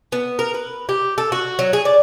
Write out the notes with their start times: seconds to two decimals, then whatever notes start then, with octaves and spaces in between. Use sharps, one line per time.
0.12 B3
0.39 A#4
0.54 B4
0.89 G4
1.18 A4
1.32 F#4
1.59 F#3
1.73 G#4
1.85 D5